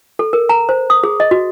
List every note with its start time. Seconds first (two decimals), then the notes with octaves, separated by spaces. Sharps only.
0.19 A4
0.33 A#4
0.49 A#5
0.69 C5
0.90 D#6
1.03 G#4
1.20 D#5
1.31 F#4